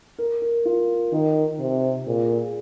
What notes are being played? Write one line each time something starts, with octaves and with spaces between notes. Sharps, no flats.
A#4
A#4
F4
D#3 D#4
C3
A#2 G#4
G#4